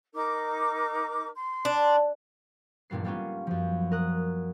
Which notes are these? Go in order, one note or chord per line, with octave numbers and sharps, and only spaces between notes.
D#4 A#4 D6
C6
D4
A1 G2 A#2 G3 B3 C7
G3 A#3 B3 C#4 F4
F#2 F3
A#4 D#6 F#6